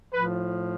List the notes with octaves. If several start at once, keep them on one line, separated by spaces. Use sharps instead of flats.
A2 F3 B4